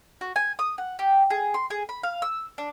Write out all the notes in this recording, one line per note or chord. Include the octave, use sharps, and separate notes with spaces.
F#4
G#5
D#6
F#5
G4
G#4
C6
G#4
B5
F5
E6
D4